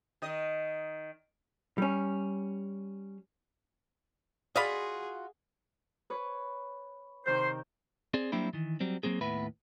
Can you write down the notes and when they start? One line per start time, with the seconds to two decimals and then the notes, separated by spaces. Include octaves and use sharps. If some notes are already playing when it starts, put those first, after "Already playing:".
0.22 D#3 D#5
1.78 G3 C#4
4.55 F4 F#4 G#4 D5 D#5 F5 B5
6.10 B4 C#5
7.26 C3 D#3 C5 G6
8.14 C4 G#4 D5
8.32 F#3 G3 A#3 C4 D4 E4
8.53 D#3 E3
8.80 F#3 G3 C4
9.03 F#3 A#3 C4 G#4
9.21 D#2 A2 B3 B4 E5 B5